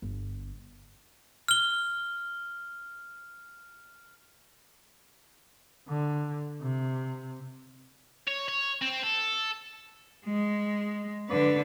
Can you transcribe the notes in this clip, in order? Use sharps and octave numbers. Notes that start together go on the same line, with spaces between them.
G1
F6 G7
D3
C3
C#5
C#5
C4
A4
G#3
D3 B4